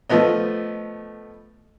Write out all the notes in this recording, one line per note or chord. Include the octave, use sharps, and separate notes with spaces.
F3 A3 B3 D#5